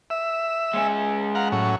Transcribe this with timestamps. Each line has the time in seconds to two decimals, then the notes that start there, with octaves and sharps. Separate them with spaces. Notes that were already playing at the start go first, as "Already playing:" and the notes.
0.10 E5
0.74 G#3 C#4
1.35 F5 F#5 A#5
1.52 A2 F#3 C#4